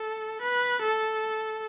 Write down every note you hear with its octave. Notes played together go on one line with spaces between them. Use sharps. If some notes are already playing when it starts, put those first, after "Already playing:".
Already playing: A4
B4
A4